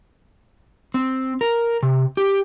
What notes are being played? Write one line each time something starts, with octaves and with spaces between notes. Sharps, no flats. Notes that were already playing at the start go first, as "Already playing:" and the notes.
C4
A#4
C3
G4